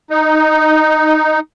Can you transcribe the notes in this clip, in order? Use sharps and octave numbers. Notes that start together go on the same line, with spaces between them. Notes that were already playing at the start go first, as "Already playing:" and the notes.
D#4